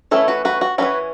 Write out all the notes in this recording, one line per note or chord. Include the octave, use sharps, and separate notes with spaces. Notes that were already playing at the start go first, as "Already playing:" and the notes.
E3 A3 C#4 E4 A4
F#4 B4
F#4 B4
F#4
E3 A3 C#4 F#4 B4